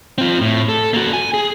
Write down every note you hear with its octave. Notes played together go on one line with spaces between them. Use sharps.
C4 F4
A2
A4
A#3 F#4
G#5
G#4